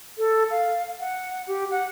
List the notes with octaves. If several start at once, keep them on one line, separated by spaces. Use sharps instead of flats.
A4
F5
F#5
G4
F#5